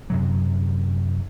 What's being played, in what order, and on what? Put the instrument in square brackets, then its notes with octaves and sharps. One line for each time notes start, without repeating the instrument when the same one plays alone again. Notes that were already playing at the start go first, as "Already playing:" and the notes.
[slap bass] F#2 C3 F#3